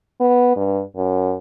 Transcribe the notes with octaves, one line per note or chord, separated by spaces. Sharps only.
B3
G2
F#2